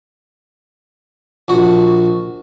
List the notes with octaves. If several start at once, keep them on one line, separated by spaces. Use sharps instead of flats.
A#1 F#4